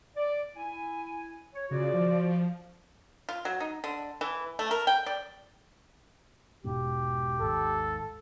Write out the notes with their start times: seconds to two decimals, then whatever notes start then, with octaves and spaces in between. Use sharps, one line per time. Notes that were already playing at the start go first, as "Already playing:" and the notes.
0.16 D5
0.57 E4 G#5
1.54 C#5
1.71 C#3 F4 F#4 D5
1.94 F3
3.29 F4
3.45 F#3
3.60 D#4
3.84 D3
4.21 E3
4.59 A3
4.71 A#4
4.87 G5
5.06 D5
6.64 E1 G#2 B2 G4
7.41 G#1 D#2 G#2 A4